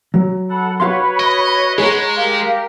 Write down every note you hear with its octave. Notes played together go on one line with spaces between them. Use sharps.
F#3
A4 F#5 B5
F#4 B4 C#5 F5 C6
D#5
G#3 G#4 F#5 A#5
G4 A#4 F5